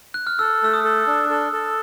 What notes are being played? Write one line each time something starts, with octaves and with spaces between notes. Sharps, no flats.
F#6
F6
A4 E6
A3 E6
D#6
A4
D4
A4
A4